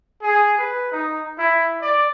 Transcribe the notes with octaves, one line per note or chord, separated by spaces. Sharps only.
G#4
B4
D#4
E4
D5